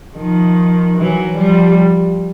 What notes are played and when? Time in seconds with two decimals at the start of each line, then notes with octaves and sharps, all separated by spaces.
0.16 D#3 F3
0.97 E3 F#3
1.38 F3 G3